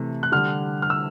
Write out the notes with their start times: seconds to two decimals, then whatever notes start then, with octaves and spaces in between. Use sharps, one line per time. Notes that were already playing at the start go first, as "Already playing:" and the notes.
Already playing: C3 E3 A3
0.23 F#6
0.32 D3 G3 F6
0.82 F6
0.90 E6